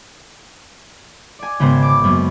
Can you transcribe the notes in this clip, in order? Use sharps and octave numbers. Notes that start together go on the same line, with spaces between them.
D5 G#5
G#1 C#3 B3 A#4 C5 G#6
D6
F#2 A#3 B3